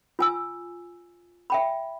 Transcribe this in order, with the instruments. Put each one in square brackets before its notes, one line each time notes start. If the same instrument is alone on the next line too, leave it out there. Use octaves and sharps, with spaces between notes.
[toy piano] F4 G#5 E6
E5 G5 B5